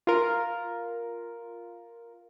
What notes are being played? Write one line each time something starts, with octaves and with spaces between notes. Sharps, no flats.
F4 A#4